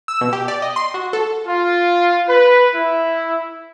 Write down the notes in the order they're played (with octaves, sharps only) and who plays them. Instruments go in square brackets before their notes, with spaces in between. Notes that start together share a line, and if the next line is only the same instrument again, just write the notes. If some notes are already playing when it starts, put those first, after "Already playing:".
[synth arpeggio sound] E6
B2
G4
D5
D#5
C6
F#4
A4
[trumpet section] F4
B4
E4